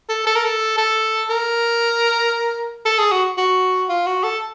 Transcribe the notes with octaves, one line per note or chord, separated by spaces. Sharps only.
A4
A4
A#4
A4
A4
A#4
A4
G#4
F#4
F#4
F4
F#4
A4